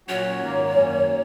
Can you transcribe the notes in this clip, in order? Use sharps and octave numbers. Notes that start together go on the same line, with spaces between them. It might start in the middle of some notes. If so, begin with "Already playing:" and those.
A#2 F#3 C#4 F#4 C#5
G#2 D#3 A#3
F#2 D#3 F#3 A#3 C#4